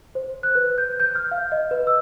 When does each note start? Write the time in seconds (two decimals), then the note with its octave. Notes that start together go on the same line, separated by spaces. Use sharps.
0.15 C5
0.43 F#6
0.55 B4
0.78 G6
1.00 G6
1.15 F6
1.31 F5
1.52 D#5
1.71 B4
1.87 E6